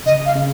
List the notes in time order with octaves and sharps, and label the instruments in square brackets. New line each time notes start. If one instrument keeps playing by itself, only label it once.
[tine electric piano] C#3 [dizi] D#5
[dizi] F5
[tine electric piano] C#3